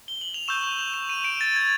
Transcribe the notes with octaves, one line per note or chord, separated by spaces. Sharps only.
G7
F#7
F7
C#6 E6 G6 E7
F7
F7
E7
D#7
D7
A6
G#6